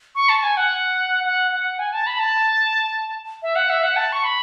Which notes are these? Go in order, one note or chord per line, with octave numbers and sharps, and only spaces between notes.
C#6
A5
G#5
F#5
F#5
F#5
G#5
A5
B5
A5
E5
F#5
E5
F#5
A5
C#6
B5